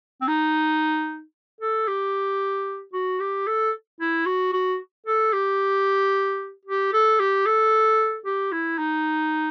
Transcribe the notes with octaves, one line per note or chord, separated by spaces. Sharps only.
C4
D#4
A4
G4
F#4
G4
A4
E4
F#4
F#4
A4
G4
G4
A4
G4
A4
G4
E4
D#4